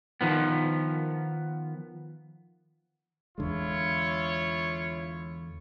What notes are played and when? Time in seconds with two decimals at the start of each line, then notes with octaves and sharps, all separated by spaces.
0.21 D#3 F3 B3
3.38 E2 D3 G#3 E4 F4 C#5